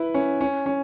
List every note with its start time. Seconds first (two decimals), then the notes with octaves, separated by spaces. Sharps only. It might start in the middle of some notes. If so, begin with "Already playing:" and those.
Already playing: E4 B4
0.14 C#4
0.41 C#4
0.66 C#4